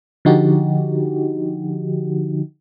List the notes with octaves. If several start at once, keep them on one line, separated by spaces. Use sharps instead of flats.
D3 F3 D#4 F#4 G4